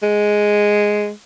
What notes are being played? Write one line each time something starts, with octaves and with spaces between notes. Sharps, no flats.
G#3